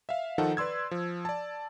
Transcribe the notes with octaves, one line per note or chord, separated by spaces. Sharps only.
E5 F5
D#3 F3 D#4 A4 F#5
B4 D5 C6 E6 G#6
F3
D5 A5